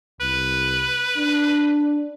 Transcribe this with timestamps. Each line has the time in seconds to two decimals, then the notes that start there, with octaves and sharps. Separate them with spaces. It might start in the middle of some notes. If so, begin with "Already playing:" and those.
0.21 C2 B4
1.17 D4